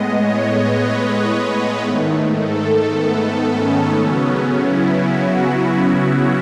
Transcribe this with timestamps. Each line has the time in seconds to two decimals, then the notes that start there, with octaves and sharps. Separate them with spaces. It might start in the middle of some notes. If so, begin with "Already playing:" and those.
Already playing: A2 G#3 B3 D#5
0.13 C#5
0.68 B4
1.79 G#2 D#3 A3
2.35 A4
2.90 B3
3.46 C#4
4.01 C#3 F#3 B3
4.57 E4
5.13 F#4